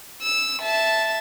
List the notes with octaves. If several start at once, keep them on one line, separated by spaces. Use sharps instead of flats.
E6
E5 A5